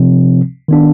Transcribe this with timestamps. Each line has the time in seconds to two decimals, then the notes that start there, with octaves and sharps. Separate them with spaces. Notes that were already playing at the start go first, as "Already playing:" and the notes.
Already playing: C3 F3 C4
0.68 D#3 B3 D4